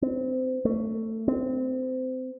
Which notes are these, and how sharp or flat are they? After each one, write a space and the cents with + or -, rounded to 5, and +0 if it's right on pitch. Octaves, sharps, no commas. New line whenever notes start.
C4 -25
A3 +20
C4 -25